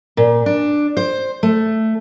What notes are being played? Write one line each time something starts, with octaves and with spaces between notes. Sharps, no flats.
A#2
D4
C5
A3